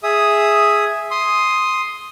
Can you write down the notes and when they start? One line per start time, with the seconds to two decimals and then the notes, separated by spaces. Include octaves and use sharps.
0.03 G#4 E5 D#6
1.11 C6 D#6